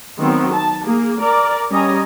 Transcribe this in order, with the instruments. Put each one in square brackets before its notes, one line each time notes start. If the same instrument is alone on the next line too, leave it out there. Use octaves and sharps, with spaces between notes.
[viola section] D#3 F#3 B3 C4
A5
A#3 G#4
A#4 D5
G3 C#4 G4 D#5 G#5 A#5